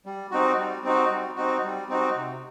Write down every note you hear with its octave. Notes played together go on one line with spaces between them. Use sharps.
G3
C4 D#4 F#4
G3
C4 D#4 F#4
G3
C4 D#4 F#4
G3
C4 D#4 F#4
C3